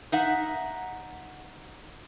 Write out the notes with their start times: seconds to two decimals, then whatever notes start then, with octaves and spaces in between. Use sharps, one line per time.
0.12 D#4 E5 F#5